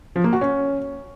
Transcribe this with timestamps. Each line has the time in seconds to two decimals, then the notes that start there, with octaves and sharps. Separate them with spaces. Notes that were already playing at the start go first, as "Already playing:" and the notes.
0.16 F3
0.24 A#3
0.33 F#4
0.41 C#4